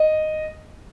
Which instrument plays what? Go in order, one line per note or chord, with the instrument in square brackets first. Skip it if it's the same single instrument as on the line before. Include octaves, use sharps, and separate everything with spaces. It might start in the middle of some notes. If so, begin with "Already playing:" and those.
Already playing: [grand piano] D#5